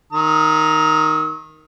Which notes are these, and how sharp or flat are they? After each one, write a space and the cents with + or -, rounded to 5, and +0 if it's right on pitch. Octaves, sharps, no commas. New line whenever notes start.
D#3 +0 A#5 +0 E6 -40